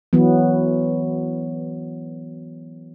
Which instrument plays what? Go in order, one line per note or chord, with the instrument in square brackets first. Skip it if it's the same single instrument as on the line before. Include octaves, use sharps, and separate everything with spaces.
[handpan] E3 F#3 B3